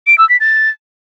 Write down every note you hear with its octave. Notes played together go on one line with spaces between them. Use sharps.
D7
E6
B6
A6